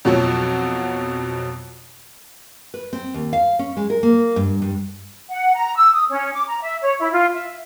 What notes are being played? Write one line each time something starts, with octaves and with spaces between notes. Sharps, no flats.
F2 B2 F3 F#3
B4
C4
D#2
F5
C#4
G#3
A#4
A#3
G2
G2
F#5
A#5
E6
D#6
C#4
D6
A#5
E5
C#5
E4
F4
E5